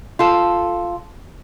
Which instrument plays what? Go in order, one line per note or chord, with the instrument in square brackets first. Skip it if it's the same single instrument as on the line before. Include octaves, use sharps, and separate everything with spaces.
[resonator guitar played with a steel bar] F4 A4